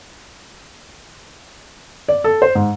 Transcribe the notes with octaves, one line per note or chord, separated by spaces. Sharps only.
D5
A4
C5
G#2